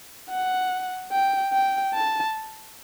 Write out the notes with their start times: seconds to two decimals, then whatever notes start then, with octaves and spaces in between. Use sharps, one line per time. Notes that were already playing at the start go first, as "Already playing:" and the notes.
0.30 F#5
1.12 G5
1.53 G5
1.94 A5